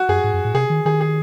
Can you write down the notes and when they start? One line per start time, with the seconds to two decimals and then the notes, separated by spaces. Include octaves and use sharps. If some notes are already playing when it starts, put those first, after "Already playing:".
Already playing: F#4
0.09 F#2 G#4
0.24 G#2
0.33 F#2
0.45 A2
0.54 C3 G#4
0.70 D#3
0.85 D#3 G#4
1.01 G#4